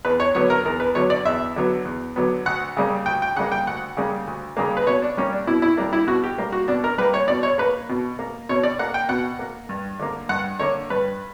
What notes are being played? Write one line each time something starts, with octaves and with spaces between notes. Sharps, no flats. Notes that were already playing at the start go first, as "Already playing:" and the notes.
E2 B4
C#5
D3 F#3 B3 C#5
A#4
E2 A#4
B4
D3 F#3 B3 C#5
D5
E2 E5
D3 F#3 B3
E2
D3 F#3 B3
D2 F#5
C#3 G3 A#3
D2 G5
G5
C#3 G3 A#3 F#5
G5
D2 F#5
C#3 G3 A#3
D2
C#3 G3 A#3
B4
B2 C#5
D4
G3 A#3 C#4
D4
B2 E4
E4
G3 A#3 D4
E4
B2 F#4
G4
G3 A#3
F#4
B2 D4
A#4
G3 A#3 B4
C#5
B2 D5
C#5
A#3 B4
B2
A#3
B2 C#5
D5
A#3 F#5
G5
B2 F#5
A#3
G2
D3 A#3
G2 F#5
D3 A#3 C#5
G2 B4